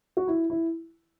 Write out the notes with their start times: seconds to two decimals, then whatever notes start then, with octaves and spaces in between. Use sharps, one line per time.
0.17 F#4
0.27 E4
0.50 E4